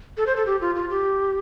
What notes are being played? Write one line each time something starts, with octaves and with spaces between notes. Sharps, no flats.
A4
C5
A4
G4
F4
F4
G4